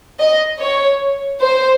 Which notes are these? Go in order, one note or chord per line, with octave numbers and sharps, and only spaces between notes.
D#5
C#5
C5